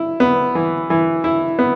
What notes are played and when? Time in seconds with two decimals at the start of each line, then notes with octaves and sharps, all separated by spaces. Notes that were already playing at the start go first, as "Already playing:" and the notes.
Already playing: E4
0.20 B3
0.55 E3
0.90 E3
1.24 E4
1.59 B3